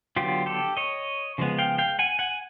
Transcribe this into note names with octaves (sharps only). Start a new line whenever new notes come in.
D3 F#3 B3 F4 G4
G4 A4
C#5 D#5
C#3 F3 G#3 B3
F5 G5
F5 G5
F#5 G#5
F#5 G#5